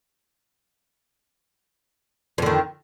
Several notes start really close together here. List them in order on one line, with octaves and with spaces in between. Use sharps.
F2 D3 D#3